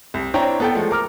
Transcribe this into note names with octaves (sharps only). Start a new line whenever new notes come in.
C2
C4 D4 E4 C#5 G5 A#5
B3 A4 G5
F3 G#3 A3
A#4 D6 F6